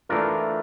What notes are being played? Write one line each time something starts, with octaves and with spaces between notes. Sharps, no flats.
E3 A3 D4 F4 A#4